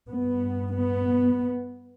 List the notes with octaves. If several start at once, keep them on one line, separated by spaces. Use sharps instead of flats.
G2 B3
B3